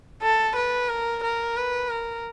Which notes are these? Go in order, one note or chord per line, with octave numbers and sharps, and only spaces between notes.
A4
B4
A#4
A#4
B4
A#4